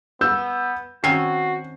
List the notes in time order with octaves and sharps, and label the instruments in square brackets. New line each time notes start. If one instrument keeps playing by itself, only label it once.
[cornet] B3 [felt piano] E6 G6
[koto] D#3 C4 C#4 [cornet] F#4 [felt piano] C7